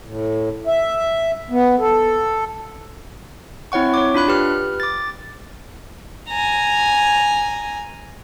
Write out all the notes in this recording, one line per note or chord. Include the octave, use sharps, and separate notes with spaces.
A2
E5
B3
A4
C4 E4 C#5 F#5 C#6
C#5 D6
D4 F4 B5 F#6
G4 B4 F6
D6 A6
G#5 A#5